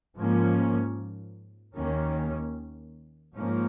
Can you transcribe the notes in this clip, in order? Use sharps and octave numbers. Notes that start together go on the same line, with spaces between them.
G#2 F3 A#3 C#4
D#2 D#3 A#3 C#4
G#2 F3 A#3 C#4